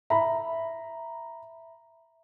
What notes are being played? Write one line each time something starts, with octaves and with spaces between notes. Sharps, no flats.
E5 A#5 B5